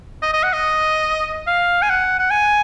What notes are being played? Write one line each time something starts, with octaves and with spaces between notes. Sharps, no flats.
D#5
D#5
F#5
D#5
F5
G#5
F#5
F#5
G#5